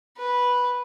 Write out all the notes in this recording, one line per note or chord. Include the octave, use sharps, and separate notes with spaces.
B4